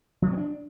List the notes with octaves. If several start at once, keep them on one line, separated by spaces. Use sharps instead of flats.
F3
F#3
C4
D4